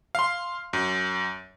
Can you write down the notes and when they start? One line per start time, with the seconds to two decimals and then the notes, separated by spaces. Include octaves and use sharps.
0.15 F5 C6
0.73 F#2